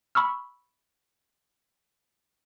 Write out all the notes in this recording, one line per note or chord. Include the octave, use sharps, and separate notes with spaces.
B5 C#6 E6 F6